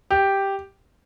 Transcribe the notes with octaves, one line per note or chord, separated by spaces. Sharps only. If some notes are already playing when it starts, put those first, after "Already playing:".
G4